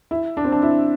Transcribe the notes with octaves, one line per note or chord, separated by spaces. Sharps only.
E4
D4
C4
D4
E4